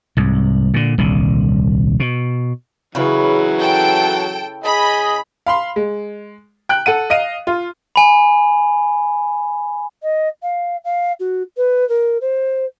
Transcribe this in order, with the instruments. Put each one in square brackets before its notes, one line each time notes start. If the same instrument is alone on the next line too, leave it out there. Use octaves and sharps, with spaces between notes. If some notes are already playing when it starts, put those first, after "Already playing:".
[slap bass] C2 G#2
A#2 D3
D#1 C2 D3
B2
[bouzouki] C#3 E4 B4 [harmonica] E3 F#3
[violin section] A4 G5 D7
[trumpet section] G#4 D#5 [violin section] B5
[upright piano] F5 B5 C6
G#3
G5 F#6
A4 F#5 D#7
D#5 F5 D#7
F4
[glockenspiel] G#5 B5
[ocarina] D#5
F5
F5
F#4
B4
A#4
C5